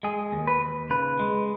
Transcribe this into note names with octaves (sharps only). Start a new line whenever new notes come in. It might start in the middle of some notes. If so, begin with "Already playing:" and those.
G#3 G#4
D#2
B4
D#2
C#3 B4
G#3